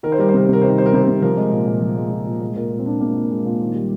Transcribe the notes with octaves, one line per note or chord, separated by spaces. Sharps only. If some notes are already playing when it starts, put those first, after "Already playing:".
D#3 A#4
C5
G3 A#4
C5
C3 A#4
C3 C5
A#4
D#3 C5
A#4
G3 C5
A#4
C3 C5
C3 A#4
F3 A#4
G#3
A#2
A#2
F3
G#3
A#2
A#2
G#3
A#2 A#4
G#3
C4
A#2 D4
G#3 A#3
A#2
G#3
A#2
D#3
G3